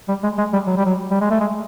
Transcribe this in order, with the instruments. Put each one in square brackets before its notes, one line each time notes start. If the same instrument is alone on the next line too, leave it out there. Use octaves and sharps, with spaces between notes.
[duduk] G3
G#3
G#3
G3
F#3
G3
F#3
G3
G#3
A3
G#3